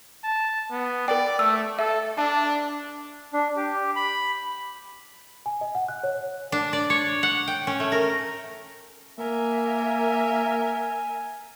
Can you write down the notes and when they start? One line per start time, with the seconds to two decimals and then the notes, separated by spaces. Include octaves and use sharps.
0.24 A5
0.71 B3
1.08 A#4 D5 G5
1.39 A3 E6
1.79 A4 E5
2.18 D4 A5
3.33 D4
3.57 G4
3.96 B5
5.46 G#5
5.61 D#5
5.75 F#5
5.89 F#6
6.03 C#5
6.52 D4
6.73 D5
6.90 C#5
7.23 F#5
7.48 G5
7.67 C#4
7.80 A3
7.92 A#4
9.18 A#3 A#4 E5 G#5